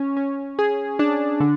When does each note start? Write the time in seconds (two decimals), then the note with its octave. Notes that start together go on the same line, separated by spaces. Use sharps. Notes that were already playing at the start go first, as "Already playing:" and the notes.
Already playing: C#4
0.17 C#4
0.59 G#4
0.99 D4
1.40 D3